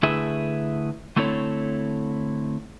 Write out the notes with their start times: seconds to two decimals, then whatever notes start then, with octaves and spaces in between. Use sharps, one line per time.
0.03 D3 A3 E4 G#4 B4 E5
1.16 D3 A3 C4 E4 A4 C#5